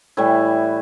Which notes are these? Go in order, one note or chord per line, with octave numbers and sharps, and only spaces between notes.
A2 E3 G3 E4